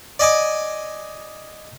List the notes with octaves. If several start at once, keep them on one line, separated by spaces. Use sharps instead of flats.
D5 D#5 G#5 D6